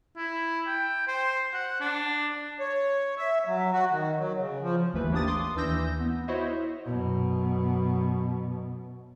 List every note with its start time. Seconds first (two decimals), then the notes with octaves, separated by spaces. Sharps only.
0.17 E4
0.67 G5
1.08 C5
1.54 F#5
1.81 D4
2.60 C#5
3.18 E5
3.47 F#3
3.73 F#4
3.91 D#3
4.19 F#3
4.38 C#3
4.62 F3
4.93 G1 D#2 E3 A3 B4
5.12 A#3 D4 G4 D#6 A6
5.27 C6 D6 D#6
5.55 D#2 E3 D4 E6 G6 A#6
6.00 B3
6.28 E4 F#4 C5 C#5 D#5 E5
6.86 F#2 B2